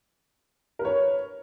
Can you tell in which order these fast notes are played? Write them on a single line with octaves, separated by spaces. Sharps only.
A#4 B4 C#5